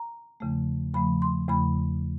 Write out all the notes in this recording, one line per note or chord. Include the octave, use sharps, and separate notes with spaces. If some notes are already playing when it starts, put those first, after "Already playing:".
Already playing: A#5
E2 C#3 F3 A3
E2 C#3 F3 A3 B5
C6
E2 C#3 F3 A3 B5